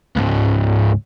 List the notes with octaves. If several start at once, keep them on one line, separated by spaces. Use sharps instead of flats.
C#2 G#2